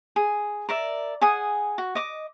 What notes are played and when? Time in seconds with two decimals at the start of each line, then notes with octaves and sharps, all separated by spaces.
0.16 G#4
0.69 A#4 D5 E5
1.21 G#4 F#5 G#5 D#6
1.78 F#4
1.95 D#5 D6